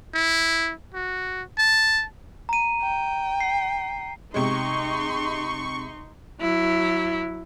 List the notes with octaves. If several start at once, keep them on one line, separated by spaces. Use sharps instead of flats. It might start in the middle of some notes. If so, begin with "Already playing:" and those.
E4
F#4
A5
A#5 D#7
G5
C7
C3 G#3 D#4 C6 C#6
F#3 E4